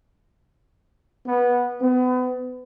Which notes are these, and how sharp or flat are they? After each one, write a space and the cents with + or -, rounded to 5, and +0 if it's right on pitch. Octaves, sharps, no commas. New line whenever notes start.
B3 -15
B3 +35